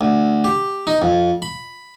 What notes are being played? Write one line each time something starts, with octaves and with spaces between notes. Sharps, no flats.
D2
G4
D#4
F2
B5